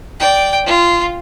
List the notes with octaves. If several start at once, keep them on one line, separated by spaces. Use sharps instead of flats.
D5 G5
F4